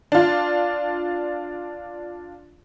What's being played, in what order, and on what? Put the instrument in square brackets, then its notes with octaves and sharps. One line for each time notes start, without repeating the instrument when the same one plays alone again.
[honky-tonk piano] D4 F4